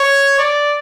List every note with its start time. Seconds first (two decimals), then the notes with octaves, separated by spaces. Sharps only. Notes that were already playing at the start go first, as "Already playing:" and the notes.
Already playing: C#5
0.39 D5